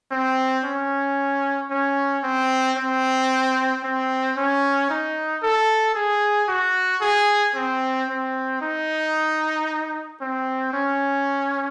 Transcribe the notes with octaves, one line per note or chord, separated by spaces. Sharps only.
C4
C#4
C#4
C4
C4
C4
C#4
D#4
A4
G#4
F#4
G#4
C4
C4
D#4
C4
C#4